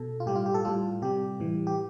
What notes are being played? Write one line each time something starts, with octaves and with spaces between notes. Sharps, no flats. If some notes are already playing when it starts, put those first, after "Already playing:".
Already playing: B2 A4
F4
A2 G3 G4
F4
G4
A4
A2 G3 F4
C3 G3 G4
A2 E3 G3
G4